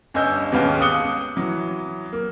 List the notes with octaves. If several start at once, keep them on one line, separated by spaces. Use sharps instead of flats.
G1 C#4 D#5 G#5 E6 G6
D#2 G#2 B3 C#4 F5 G5
D6 D#6 F#6 C#7 G7
E3 F#3
A#3